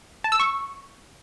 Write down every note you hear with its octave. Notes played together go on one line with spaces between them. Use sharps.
A5
E6
C#6